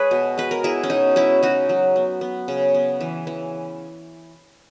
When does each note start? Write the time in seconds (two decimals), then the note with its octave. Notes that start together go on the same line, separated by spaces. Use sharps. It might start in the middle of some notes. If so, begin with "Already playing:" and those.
Already playing: G#3 G#4 B4 C#5
0.11 B2
0.38 G#3 B4
0.51 A#4
0.63 B2 E4 G#4
0.83 C#4
0.90 B2 D#4
1.16 G#3 C#4 E4
1.43 C#3 D#4 F#4
1.69 F#3
1.96 B3
2.21 B3
2.48 C#3
2.74 B3
3.01 E3
3.27 E3